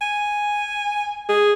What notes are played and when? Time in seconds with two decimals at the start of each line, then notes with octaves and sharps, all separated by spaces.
0.01 G#5
1.29 G#4